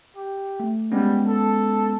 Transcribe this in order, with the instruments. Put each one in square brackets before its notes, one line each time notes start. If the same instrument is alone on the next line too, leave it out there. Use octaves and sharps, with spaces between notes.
[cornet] G4
[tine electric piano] A3
[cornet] G3 [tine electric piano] G#3 B3 C#4
[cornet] A4